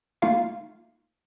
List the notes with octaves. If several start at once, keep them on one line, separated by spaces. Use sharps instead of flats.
A3 A#3 D#4 F4 F5 C#6